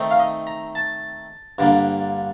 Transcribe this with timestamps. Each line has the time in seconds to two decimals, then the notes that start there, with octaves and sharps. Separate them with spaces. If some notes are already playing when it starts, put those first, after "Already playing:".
Already playing: D#3 A3 C4 D#4
0.11 F5
0.20 D#5
0.47 A#5
0.75 A5
1.58 G2 D3 G3 A#3